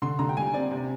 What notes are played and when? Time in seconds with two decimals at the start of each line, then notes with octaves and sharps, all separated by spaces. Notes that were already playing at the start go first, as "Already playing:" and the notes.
0.02 D3 C6
0.19 D3 A#5
0.29 G5
0.37 G3 G#5
0.54 C4 D5
0.71 C3